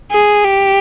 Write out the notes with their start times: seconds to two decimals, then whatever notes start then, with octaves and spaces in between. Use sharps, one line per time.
0.11 G#4
0.44 G4